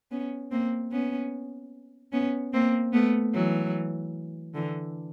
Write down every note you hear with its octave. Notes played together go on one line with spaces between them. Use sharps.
B3 C#4
A#3 C4
B3 C#4
B3 C#4
A#3 C4
A3 B3
E3 F#3
D3 E3